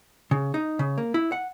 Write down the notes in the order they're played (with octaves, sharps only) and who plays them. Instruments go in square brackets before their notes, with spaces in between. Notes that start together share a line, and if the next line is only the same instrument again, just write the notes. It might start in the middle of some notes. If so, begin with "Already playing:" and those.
[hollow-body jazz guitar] C#3
D#4
C#3
A#3
E4
F#5